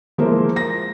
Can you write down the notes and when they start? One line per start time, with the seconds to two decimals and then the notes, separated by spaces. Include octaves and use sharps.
0.18 F3 G#3 A#3 E4 A#4 C5
0.56 A#6